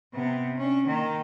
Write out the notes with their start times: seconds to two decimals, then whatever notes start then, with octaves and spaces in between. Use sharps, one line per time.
0.14 C3 B3
0.57 C#4 D4
0.87 D#3 A#3